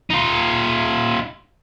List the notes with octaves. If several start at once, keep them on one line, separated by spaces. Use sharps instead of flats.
D#4 F4